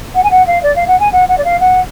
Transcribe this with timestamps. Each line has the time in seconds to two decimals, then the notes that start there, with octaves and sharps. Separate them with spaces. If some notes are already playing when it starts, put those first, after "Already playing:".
0.15 F#5
0.23 G#5
0.31 F#5
0.47 F5
0.63 D5
0.76 F5
0.88 F#5
1.00 G#5
1.12 F#5
1.29 F#5
1.38 D5
1.45 F5
1.60 F#5